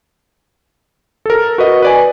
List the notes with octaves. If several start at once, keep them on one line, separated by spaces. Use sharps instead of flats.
A4 A#4
F#4 B4 D#5
B4 D5 G#5